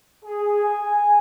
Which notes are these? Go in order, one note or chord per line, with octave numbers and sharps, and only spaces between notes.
G#4
G#5